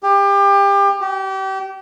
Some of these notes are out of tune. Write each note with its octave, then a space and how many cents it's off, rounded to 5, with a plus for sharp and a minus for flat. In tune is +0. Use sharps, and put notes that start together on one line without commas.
G4 +30
G4 -30